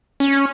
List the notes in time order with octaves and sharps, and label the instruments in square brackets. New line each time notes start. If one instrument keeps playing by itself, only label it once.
[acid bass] C#4